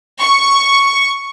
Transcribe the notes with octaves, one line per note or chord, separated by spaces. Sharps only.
C#6